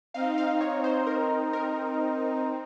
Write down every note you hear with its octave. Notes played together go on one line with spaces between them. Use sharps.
C4 D#4 F5
F5
C#5
C5
A#4
A#4